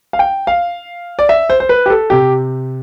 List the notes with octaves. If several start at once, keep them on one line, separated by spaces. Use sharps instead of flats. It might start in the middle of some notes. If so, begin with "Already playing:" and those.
F5
G5
F5
D5
E5
C5
C5
B4
G4
A4
C3 G4